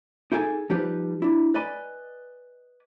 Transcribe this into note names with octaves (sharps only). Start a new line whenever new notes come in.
D#4 E4 G#4 A4 G#5
F3 G3 D#4 G4 B4
D4 E4
B4 D5 D#5 G#5 B5